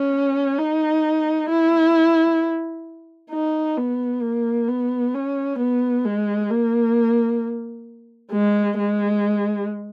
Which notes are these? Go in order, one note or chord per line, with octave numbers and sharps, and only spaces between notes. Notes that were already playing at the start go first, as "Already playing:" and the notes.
Already playing: C#4
D#4
E4
D#4
B3
A#3
B3
C#4
B3
G#3
A#3
G#3
G#3